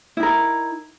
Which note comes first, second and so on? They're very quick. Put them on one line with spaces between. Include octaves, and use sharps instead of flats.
E4 D#4 A#4